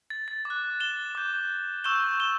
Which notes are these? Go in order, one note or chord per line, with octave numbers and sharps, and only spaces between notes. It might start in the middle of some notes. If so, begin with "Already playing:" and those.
A6
A6
D6
F#6
E7 G7
D6 G6
C#6 E6 G6 E7 G7
E7 G7